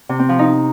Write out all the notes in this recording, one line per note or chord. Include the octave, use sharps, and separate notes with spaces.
C3
C4
F3
D#4